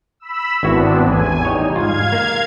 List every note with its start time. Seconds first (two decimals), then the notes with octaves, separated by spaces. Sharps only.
0.20 B5 E6
0.63 G#1 B3 C4 D4 E4 F#4
1.06 A1 E2 G#5
1.45 G3 D#4 C#5 D#5 G5
1.76 G#2 F4 F5 G#6
2.13 A#3